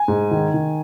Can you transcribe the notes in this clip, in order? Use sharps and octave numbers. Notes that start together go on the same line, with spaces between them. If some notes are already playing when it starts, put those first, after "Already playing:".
Already playing: G#5
G#2
D#3
D#3